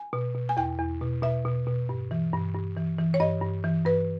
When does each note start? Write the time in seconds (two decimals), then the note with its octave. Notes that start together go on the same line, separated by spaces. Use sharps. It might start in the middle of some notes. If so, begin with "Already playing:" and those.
Already playing: G#5
0.13 B2
0.35 B2
0.49 G#5
0.57 E2 G5
0.79 E2
1.01 B2
1.23 B2 E5
1.45 B2
1.67 B2
1.89 G2
2.11 E3
2.33 G2
2.54 G2
2.77 E3
2.99 E3
3.14 C#5
3.20 G2 D#5
3.42 G2
3.64 E3
3.86 G2 B4